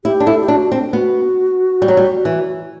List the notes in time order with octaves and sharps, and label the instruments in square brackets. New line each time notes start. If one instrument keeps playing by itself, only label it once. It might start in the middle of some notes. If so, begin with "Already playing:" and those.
[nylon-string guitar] E4 [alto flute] G4
[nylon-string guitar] D4
[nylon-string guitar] E4 [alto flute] A4
[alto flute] G4
[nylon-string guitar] D4 [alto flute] F#4
[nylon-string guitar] C4 [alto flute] D4
[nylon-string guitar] B3 [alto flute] F#4
[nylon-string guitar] G3
F#3
G3
E3